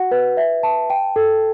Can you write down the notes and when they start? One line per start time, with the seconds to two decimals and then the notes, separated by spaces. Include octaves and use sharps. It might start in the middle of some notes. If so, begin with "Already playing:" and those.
Already playing: F#4 F#5
0.12 B4
0.37 E5
0.63 A5
0.90 G5
1.16 A4